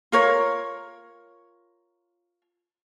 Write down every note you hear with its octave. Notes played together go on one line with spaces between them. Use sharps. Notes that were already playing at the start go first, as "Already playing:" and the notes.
F4 A#4 C#5